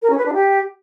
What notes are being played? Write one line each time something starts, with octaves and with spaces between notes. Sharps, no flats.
A#4
C#4
B4
D4
G4